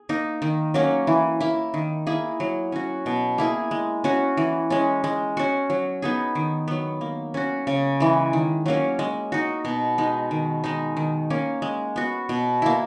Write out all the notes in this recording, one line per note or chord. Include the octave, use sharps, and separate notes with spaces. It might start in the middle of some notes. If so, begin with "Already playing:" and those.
Already playing: G#4
A#3 D#4
D#3
F#3 A#3 C#4
E3
A#3 E4
D#3
A#3 E4 G#4
F#3
C#4 F#4
B2
A#3 E4 G#4
G#3
C#4 F#4
E3
G#3 C#4
G#3
C#4 F#4
F#3
B3 D#4 G#4
D#3
F#3 B3
A#3
C#4 F#4
C#3
E3 G#3
D#3
F#3 A#3 C#4
G#3
D#4 F#4
B2
G#3 D#4
D#3
G#3 D#4
D#3
A#3 C#4
G#3
B3 F#4
B2
A#3 E4